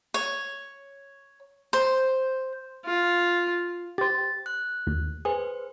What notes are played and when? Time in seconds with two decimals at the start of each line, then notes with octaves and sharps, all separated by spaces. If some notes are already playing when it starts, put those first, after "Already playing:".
0.14 C#5
1.73 C5
2.85 F4
3.98 G4 C5 A6
4.46 F#6
4.87 D#2
5.25 G#4 B4 C5